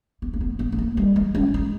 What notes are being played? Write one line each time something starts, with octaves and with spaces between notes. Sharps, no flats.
B3
A#3
B3
B3
B3
A#3
G3
G#3
C#4
D#4